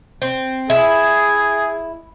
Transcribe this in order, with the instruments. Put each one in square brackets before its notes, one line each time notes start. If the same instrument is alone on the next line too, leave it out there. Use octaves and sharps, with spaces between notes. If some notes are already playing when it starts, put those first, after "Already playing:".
[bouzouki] C4
[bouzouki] E4 [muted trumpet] G#4